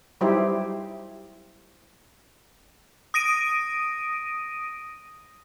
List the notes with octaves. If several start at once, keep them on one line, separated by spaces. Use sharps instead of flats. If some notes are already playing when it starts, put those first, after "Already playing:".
F#3 G3 D#4 E4 G4 C5
D#6 A#6 D7 D#7